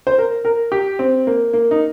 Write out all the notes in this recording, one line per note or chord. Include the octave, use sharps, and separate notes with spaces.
C5
A#4
A#4
G4
C4
A#3
A#3
D#4